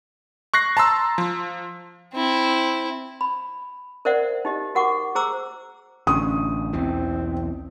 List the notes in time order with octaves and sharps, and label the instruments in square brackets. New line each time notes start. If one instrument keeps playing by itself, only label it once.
[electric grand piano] C#6 F#6 A#6 C7
A5 A#5 C6 E6
F3
[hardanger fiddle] C4 E4
[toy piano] B5
A#4 C5 D5 E5 F#5
D#4 G4 D#5
F#4 A#4 F#5 C#6 D6
G#4 C5 A#5 D6 E6
[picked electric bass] A1 D3 [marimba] C#4 [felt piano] D#6
[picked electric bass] B1 E2 E3 [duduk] C4